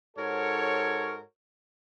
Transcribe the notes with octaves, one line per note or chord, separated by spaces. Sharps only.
G#2 F#4 A4 A#4 C#5